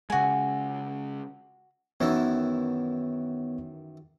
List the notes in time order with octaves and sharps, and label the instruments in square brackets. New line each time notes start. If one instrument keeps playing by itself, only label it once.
[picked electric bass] C#3 G#3 [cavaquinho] F#4 G#5
[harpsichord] F#2 D#3 E3 [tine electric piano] B3 C#5